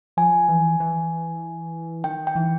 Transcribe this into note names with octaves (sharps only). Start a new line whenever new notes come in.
F3 G#5
E3
E3
D#3 G5
G5
E3